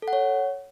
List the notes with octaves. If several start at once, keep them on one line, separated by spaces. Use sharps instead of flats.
A4
F#5
C#5